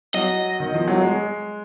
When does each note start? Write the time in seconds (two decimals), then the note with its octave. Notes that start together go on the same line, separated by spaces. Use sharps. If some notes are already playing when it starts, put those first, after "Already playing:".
0.14 F#3 D#5
0.60 D#3
0.74 F3
0.88 F#3
1.01 G#3